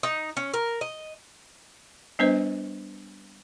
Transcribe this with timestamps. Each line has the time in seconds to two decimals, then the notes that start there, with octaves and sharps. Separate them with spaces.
0.03 D#4
0.37 C#4
0.54 A#4
0.81 D#5
2.19 G3 B3 D4 B4 C5 D#5